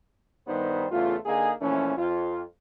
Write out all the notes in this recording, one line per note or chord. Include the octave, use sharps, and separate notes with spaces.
G2 D#3 G3 B3 D#4 C5
E2 C#3 A3 F4
D3 A#3 D#4 G#4
A#2 E3 F3 A3 C#4
F2 F4